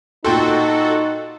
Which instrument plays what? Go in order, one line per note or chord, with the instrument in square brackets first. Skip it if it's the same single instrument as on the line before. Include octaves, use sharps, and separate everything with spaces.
[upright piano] A#2 G5 C6 [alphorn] D#4 [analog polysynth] F#4 A4